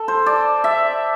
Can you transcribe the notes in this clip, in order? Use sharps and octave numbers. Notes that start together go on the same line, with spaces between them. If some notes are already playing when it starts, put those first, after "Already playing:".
Already playing: A4
C5
D5
E5